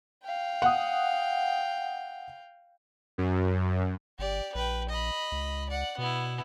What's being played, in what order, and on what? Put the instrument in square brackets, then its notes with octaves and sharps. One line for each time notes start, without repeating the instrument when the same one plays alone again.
[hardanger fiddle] F5 G5
[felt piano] F#5 D#6
[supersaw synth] F#2
[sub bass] G1 [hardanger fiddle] G4 D5
[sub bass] A#1 [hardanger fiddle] B4 G5
[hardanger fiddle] D#5 B5
[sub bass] C#2
[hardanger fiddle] D5 F#5
[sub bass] B2 [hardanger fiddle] B3 E4